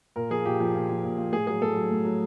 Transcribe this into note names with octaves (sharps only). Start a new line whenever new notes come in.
A#2 A#4
F3 G#4
A#2 G4
F3
A#2
F3
A#2
F3
A2 G#4
F#3 G#4
A2 A4
F#3
A2
F#3